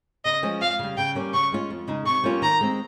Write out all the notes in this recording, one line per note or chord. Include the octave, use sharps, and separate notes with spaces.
C#3 D#5
F3 G#3 C#4
F2 F5
C#3 G3
C#3 G5
G3 A#3 C#4
C#3 C#6
G#3 C#4 F4
F2
C#3 G#3 D#4
C3 C#6
G3 A#3 C#4 F4
D#3 A#5
G#3 C4